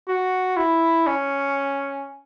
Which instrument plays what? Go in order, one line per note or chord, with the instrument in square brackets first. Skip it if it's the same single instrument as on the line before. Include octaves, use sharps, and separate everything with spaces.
[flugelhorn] F#4
E4
C#4